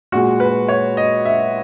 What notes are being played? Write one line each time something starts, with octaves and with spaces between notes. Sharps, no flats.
A#2 G#3 F#4
B4
C#5
D#5
E5